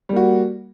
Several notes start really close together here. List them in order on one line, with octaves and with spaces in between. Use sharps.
G3 A#3 F#4